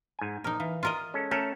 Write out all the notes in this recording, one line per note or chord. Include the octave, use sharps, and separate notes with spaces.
G#2 G#5
A#1 D#4 A#4
E3 F5
F4 A#4 D#5
G#3 C#4 A4
A3 C#4 A4 A#4